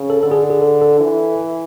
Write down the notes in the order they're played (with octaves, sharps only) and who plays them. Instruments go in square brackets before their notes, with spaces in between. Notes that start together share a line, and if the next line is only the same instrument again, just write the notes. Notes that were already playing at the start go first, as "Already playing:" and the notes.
Already playing: [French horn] C#3
[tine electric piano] A4
[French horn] D3 [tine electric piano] A4
[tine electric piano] G#4
G#4
A4
A4
[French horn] E3